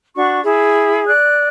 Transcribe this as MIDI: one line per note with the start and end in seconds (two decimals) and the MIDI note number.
0.16 0.40 62
0.16 0.40 66
0.16 0.40 85
0.44 1.04 64
0.44 1.11 68
1.06 1.48 74
1.06 1.48 90